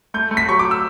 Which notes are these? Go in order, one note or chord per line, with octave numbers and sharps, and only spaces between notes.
A3 G6
A3
B6
F#3 C#6
D6
E6